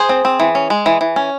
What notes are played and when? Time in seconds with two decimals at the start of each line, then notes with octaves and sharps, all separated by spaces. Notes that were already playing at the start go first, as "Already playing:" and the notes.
Already playing: G#4 C5
0.09 C4
0.25 C4
0.40 E3
0.55 C#4
0.70 G#3
0.86 E3
1.01 E3
1.16 C#4